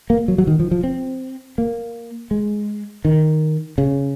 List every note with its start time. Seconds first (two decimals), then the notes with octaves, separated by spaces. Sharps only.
0.10 A#3
0.28 F#3
0.38 F#3
0.47 D#3
0.60 F3
0.71 F3
0.84 C4
1.58 A#3
2.31 G#3
3.05 D#3
3.78 C#3